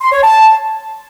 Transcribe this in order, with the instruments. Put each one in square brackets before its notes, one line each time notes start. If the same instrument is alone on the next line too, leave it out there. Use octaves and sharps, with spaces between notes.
[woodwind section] C6
C#5
A5